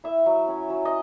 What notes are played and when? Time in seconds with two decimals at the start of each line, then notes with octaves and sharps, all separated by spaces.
0.04 E4 E5
0.26 F#3
0.47 C#4
0.70 F#3
0.85 D#5